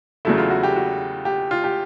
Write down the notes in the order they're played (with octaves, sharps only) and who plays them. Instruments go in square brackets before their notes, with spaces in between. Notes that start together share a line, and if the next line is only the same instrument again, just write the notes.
[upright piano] E2 C#3 F#3 A3 E4
F4
F#4
G4
F#4
G4
F4
G4